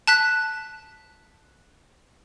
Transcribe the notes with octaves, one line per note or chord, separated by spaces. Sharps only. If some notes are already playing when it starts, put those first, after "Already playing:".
A5 F#6 B6